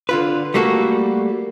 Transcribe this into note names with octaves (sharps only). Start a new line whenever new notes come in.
D3 F4 B4
G3 A3 A#3 F#4 A4